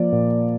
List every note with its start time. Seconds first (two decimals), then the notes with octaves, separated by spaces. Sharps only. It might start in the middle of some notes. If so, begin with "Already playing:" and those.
Already playing: F3 A#3 D5
0.12 A#2